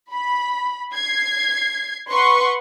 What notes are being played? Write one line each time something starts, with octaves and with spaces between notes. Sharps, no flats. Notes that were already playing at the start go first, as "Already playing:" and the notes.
B5
G#6 C7
B4 F#5 C6 C#6